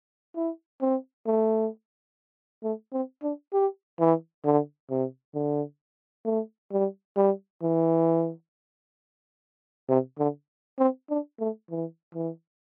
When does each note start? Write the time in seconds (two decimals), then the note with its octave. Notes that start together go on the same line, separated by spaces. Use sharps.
0.36 E4
0.82 C4
1.27 A3
2.64 A3
2.93 C4
3.23 D4
3.53 G4
4.00 E3
4.45 D3
4.90 C3
5.35 D3
6.26 A3
6.72 G3
7.17 G3
7.63 E3
9.89 C3
10.18 D3
10.79 C4
11.10 D4
11.40 A3
11.70 E3
12.15 E3